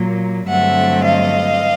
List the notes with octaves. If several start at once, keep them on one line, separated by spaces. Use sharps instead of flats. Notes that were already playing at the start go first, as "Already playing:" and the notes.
Already playing: A#2 F#3 A#3
G2 D3 F#3 A3 C4 E5 F#5
D#5 F5